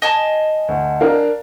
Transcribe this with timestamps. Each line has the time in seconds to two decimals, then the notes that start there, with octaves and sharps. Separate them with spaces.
0.02 D#5 G#5 A5
0.68 D2
1.00 D4 A#4 F5